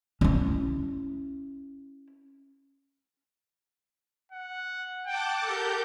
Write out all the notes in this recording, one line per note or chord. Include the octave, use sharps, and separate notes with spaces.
C#4 E4
F#5
F#5 G5 A5 D6
G4 A4 A#4 G6